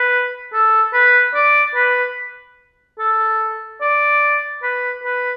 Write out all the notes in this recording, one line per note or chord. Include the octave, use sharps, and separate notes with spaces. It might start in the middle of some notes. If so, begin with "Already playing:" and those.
Already playing: B4
A4
B4
D5
B4
A4
D5
B4
B4